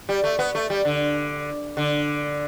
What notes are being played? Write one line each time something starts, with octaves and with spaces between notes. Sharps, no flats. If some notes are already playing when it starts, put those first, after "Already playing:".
G3
A3
B3
A3
G3
D3
D3